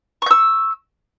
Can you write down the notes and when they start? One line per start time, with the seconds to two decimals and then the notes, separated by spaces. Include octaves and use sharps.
0.22 C#6
0.26 G6
0.31 E6